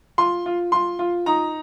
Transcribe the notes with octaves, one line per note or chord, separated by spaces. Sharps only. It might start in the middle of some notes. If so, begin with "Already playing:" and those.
F4 C6
F4
F4 C6
F4
D#4 A#5